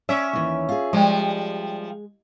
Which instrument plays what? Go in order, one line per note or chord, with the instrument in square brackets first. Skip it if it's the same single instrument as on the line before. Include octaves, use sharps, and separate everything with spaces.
[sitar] C#4 E5 [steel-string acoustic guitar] C5 D5
[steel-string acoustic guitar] D#2 E3
F4 G#4
[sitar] F3 G3 [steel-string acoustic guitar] G#3